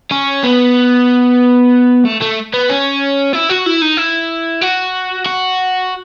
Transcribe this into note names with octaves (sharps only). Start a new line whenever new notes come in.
C#4
B3
A3
A3
B3
C#4
E4
F#4
E4
D#4
E4
F#4
F#4